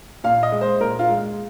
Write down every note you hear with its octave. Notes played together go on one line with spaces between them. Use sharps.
A#2 F5
D#5
G#3
C5
A#2 A#4
F4
G#3